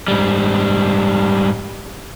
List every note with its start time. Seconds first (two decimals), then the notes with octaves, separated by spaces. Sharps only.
0.08 G#2 G3